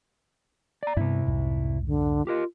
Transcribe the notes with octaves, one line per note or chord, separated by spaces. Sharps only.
D5 A#5
G2 C3 B3 E4
C2 F2 G#2
D3
F4 G4 A#4 D#5